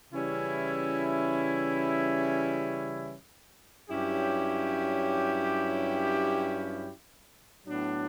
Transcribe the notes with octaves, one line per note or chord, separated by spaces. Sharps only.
C#3 E3 G3 C#4 E4
G2 F#3 C#4 E4 G4
A2 F#3 B3 D4